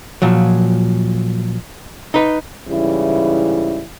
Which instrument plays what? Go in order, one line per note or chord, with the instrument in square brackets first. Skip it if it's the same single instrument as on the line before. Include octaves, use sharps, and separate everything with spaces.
[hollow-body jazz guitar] A#2 F3 F#3
D#4 B4
[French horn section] G#2 C#3 E3 G3 E4